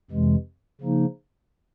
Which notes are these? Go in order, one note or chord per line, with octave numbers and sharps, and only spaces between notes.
F2 C3 E3 G#3
C#3 F3 A#3 D#4